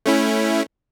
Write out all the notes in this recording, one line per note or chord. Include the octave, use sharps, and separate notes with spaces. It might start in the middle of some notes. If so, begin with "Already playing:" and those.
A3 C#4 E4